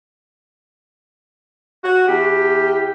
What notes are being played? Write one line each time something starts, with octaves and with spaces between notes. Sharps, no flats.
F#4
E2 G4